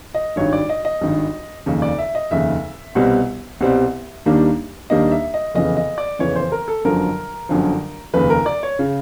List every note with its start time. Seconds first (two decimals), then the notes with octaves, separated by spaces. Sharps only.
0.14 D#5
0.36 G#1 G2 D#3 C#5
0.53 D5
0.69 D#5
0.85 D#5
1.01 G#1 G2 D#3
1.66 F1 D#2 C#3
1.82 D5
1.99 E5
2.15 D#5
2.31 F1 D#2 C#3 E5
2.95 C2 B2 G3 C4
3.61 C2 B2 G3 C4
4.26 D#2 D#3 G3 A#3 D4
4.90 D#2 D#3 G3 A#3 D4 D#5
5.11 E5
5.34 D#5
5.54 F1 E2 C#3 E3 D#5
5.77 D#5
5.98 D5
6.19 F1 E2 C#3 E3 C#5
6.36 C5
6.52 A#4
6.68 A4
6.85 G1 F#2 D3 F3 A#4
7.49 G1 F#2 D3 F3
8.13 F1 D#2 C#3 B4
8.30 A#4
8.46 D5
8.63 C#5
8.79 C#3